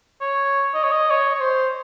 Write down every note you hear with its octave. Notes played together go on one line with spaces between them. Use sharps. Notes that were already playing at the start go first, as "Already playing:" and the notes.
C#5
D#5
C#5
D#5
C#5
C#5
C5